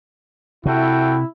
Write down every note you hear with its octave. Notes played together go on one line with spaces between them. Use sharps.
C3 E4 F#4 A4 G5